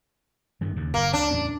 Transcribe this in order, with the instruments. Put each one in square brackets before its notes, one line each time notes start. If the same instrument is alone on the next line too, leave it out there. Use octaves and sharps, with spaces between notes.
[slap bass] G2 D#3 E3
D#2 C#3
[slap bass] F#1 [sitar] A#3
[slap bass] D2 [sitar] D4
[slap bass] E2 A2 C#4